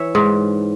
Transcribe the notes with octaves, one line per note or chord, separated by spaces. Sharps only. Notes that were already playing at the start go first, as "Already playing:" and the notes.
Already playing: E3 C#5 E5
G#2